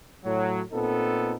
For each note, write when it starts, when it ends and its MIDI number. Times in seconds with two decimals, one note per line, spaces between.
0.24 0.61 45
0.24 0.61 54
0.73 1.34 46
0.73 1.34 59
0.73 1.34 60
0.73 1.34 63
0.73 1.34 69